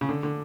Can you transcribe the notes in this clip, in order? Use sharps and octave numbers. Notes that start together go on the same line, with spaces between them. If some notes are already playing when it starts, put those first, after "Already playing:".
C#3
D3
D3